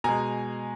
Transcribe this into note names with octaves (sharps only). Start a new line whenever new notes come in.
B2 G#3 G#5 A#5